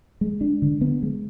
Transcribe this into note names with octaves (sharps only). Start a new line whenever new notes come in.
G#3
D4
D3
B3
G#3